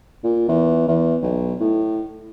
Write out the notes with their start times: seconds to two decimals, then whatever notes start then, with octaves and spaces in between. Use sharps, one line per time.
0.24 A#2
0.48 E2
0.88 E2
1.23 B1
1.60 A2